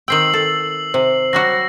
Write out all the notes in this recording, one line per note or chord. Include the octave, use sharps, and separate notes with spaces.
D#3 C4 G5 E6 C7 F#7
A4
C3 C5
F#3 G3 F#4 A#6